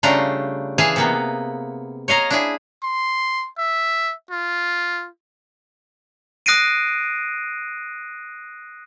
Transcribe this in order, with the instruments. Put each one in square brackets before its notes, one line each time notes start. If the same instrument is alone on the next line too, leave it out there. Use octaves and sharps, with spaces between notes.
[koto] C#3 G3 A3 D4 F4 A#5
E3 G#4 E5 F5 G#5 A5
C3 A#3 B3
C#5 D#5 F5 A#5
D4 E4 G#4
[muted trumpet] C6
E5
F4
[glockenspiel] D#6 F#6 A#6 C7 D7 D#7